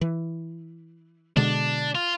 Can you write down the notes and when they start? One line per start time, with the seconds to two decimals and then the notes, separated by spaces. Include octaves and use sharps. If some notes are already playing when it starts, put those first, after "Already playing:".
0.01 E3
1.37 B2 D3 G#3 D4
1.95 F4